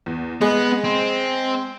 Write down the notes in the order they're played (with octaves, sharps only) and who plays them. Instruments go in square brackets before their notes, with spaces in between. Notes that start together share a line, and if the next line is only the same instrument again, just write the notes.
[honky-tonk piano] E2
[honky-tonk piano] G#3 [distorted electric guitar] B3
[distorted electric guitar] C4